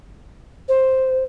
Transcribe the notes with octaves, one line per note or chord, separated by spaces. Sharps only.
C5